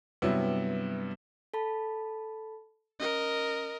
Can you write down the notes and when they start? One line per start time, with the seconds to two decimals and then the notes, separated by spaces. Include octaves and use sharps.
0.22 G2 C3 F#3 B3 E4
1.54 A4 A5 B5
3.00 C#4 A#4 D#5